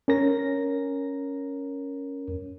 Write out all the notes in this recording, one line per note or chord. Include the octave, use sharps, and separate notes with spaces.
C#4 A#4 A#6